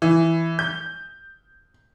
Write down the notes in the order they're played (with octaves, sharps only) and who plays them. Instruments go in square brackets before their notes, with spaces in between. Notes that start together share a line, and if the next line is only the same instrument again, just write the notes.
[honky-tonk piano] E3
G6